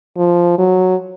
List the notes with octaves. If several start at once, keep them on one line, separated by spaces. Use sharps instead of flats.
F3
F#3